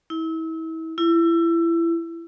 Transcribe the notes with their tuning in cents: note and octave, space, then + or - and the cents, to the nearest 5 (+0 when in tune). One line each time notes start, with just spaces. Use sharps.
E4 -35
E4 +25